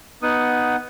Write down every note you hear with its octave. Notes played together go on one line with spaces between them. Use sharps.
B3 D#4 F#5 D#6